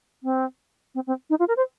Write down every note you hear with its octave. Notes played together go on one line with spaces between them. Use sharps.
C4
C4
C4
D#4
F4
A#4
C5